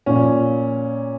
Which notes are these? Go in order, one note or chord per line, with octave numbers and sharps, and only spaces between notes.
A#2 F3 C#4